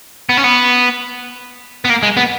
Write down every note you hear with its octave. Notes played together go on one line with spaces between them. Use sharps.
B3
C#4
B3
B3
A#3
G#3
B3